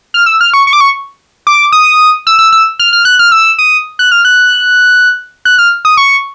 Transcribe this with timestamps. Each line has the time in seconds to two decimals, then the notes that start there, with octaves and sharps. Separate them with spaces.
0.14 F6
0.26 E6
0.41 F6
0.54 C#6
0.67 C#6
0.73 D6
0.81 C#6
1.47 D6
1.72 D#6
2.27 E6
2.39 E6
2.52 E6
2.79 F6
2.93 F6
3.05 F#6
3.19 F6
3.32 E6
3.59 D#6
3.99 F#6
4.12 F6
4.25 F#6
5.45 F#6
5.59 F6
5.85 D#6
5.97 C#6